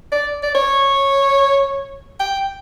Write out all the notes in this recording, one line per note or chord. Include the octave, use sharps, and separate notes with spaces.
D5
D5
C#5
G5